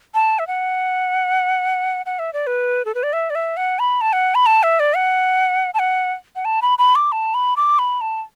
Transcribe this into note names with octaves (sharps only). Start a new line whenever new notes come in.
A5
E5
F#5
F#5
E5
D5
B4
A4
B4
D5
E5
D5
E5
F#5
B5
A5
F#5
B5
A5
E5
D5
F#5
A5
F#5
F#5
A5
B5
B5
D6
A5
B5
D6
B5
A5